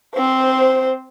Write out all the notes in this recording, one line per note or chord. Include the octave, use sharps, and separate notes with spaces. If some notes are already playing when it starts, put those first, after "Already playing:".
C4 C5